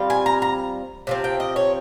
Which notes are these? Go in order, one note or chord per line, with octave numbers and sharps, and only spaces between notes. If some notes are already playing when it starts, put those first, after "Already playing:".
Already playing: G3 C4 F4
G#5
A#5
A#5
C3 F3 C4
G5
D#5
C#5